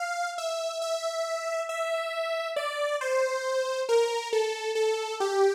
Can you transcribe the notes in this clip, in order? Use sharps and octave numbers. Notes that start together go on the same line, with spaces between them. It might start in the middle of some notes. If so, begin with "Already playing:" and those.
Already playing: F5
E5
E5
E5
D5
C5
A#4
A4
A4
G4